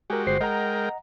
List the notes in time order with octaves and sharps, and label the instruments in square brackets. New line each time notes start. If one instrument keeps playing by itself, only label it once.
[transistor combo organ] G#3 F#4 G4 [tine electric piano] A#4 G#5
[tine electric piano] G1 C5 C7
[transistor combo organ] G#3 A#4 G5 [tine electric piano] D#5 F#5 A#5